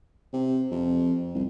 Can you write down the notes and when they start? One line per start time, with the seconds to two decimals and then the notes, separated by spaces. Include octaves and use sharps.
0.33 C3
0.71 F2
1.35 C2